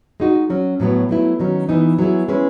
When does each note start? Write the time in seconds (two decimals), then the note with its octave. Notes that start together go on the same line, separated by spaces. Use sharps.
0.20 G#3 D#4 F#4
0.50 F#3 C#4 F#4
0.80 A2 F#3 B3
1.09 F#3 A3 E4
1.39 D#3 F#3 C#4
1.69 E3 B3 D#4
1.99 F#3 B3 E4 G#4
2.29 G#3 C#4 E4 B4